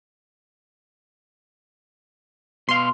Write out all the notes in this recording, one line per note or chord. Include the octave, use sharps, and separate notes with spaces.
B2 F5 C6